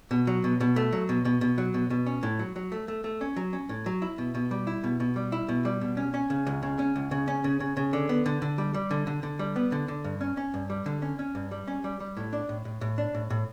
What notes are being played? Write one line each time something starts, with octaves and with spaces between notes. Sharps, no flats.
B2
F#3
B2
B2
A3
F#3
B2
B2
B2
F#3
B2
B2
C#4
A2
F#3
F#3
A3
A3
A3
C#4
F#3
C#4
A2
F#3
E4
B2
B2
G3
E4
B2
B2
G3
E4
B2
G3
B2
C#4
C#4
C#3
C#2
C#3
C#4
C#2
C#3
C#4
C#3
C#3
C#3
D3
B3
D3
D3
G3
G3
D3
D3
D3
G3
B3
D3
D3
G2
C#4
C#4
G2
G3
D3
C#4
C#4
G2
G3
C#4
G3
G3
A2
D4
A2
A2
A2
D4
A2
A2